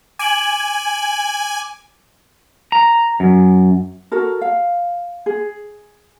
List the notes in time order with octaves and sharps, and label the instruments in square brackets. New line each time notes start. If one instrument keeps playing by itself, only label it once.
[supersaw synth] G#5 [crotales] D6 D7 F#7
[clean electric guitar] A#5
F#2
[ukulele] F#4 A4 A#4
F5
G#4